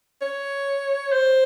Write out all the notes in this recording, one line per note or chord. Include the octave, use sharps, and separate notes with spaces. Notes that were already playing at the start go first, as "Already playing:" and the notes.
C#5
C5